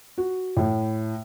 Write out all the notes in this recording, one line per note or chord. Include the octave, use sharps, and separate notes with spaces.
F#4
A2